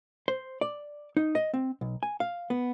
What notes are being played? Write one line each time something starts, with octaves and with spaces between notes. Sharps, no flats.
C5
D5
D#4
D#5
C4
B1
G#5
F5
B3